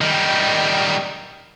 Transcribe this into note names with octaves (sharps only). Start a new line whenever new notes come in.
D#3 G3